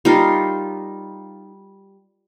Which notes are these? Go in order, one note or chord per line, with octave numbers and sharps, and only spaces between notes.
G3 D#4 F4 A#4